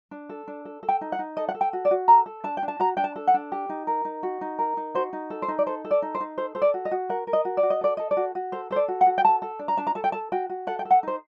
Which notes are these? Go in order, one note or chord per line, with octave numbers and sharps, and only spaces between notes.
D4
A4
D4
A4
A4
G5
D#4
F#5
D#4
A4 D#5
F#5
A4
G5
F#4
D5
F#4
A4 A#5
A4
D4 A5
G5
D4
A5
F#4 A#5
D4 G5
A5
A4
F#5
D4
G4
D#4
A#4
D#4
F#4
D#4
A#4
D#4
F#4 C5
D#4
A4
C5
D#4
D5
A4 C5
A4
D5
D#4
C5
D#4
A4 C5
A4 C5
D5
F#4
D#5
F#4
A#4 F#5
A#4
D#5
F#4
D5
F#4
D#5
A4 D5
A4 D#5
D5
F#4
F#4
A4 C5
A4 C5
D5
F#4
F#5
F#4
G5
A4 A5
A4
D4
A#5
D4 A5
A#5
A4 A5
G5
A4 A5
F#4 G5
F#4
A4 F#5
G5
A4
F#5
D#4 C5